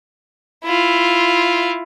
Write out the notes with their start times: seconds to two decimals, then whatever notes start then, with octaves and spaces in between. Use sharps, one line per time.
0.65 E4 F4